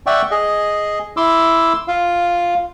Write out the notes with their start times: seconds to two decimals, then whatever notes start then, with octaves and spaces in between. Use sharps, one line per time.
0.06 D5 E5 F#5 G5 C#6
0.31 G#4 D#5
1.17 E4 C6 D6 E6
1.88 F4 F5